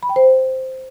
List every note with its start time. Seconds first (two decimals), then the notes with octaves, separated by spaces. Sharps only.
0.03 B5
0.09 G5
0.16 C5